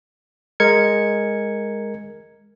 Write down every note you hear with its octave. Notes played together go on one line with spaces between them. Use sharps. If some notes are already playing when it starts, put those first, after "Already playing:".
G#3 A#4 G#6 C#7